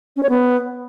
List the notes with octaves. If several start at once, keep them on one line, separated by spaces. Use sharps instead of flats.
C#4
C#5
B3